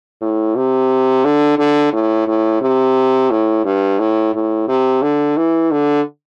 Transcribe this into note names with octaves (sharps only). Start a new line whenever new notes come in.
A2
C3
D3
D3
A2
A2
C3
A2
G2
A2
A2
C3
D3
E3
D3